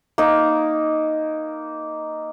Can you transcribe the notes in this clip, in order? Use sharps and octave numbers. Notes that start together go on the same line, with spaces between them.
A#3 D#4